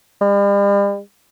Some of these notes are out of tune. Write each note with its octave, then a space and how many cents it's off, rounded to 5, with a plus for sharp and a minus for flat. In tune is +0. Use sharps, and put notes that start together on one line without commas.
G3 +40